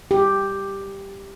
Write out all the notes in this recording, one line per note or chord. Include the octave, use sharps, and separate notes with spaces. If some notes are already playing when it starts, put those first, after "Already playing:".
G4